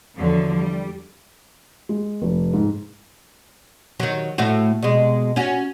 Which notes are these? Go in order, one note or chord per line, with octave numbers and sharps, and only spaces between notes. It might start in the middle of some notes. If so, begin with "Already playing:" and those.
E2 D3 F3 F#3
G3
G#3
F1
G#2
D#3 F#3
A2 A3 F#4
B2 G#3
C#4 F#4